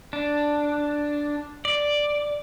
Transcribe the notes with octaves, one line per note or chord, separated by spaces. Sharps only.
D4
D5